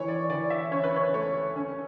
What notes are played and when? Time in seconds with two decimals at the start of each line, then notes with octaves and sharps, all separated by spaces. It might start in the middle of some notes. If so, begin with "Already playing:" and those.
Already playing: E3 C#5
0.08 D5
0.30 E3 D5
0.50 E5
0.71 C#4 C#5
0.84 B4
0.96 C#5
1.13 A3 C#5
1.56 C#4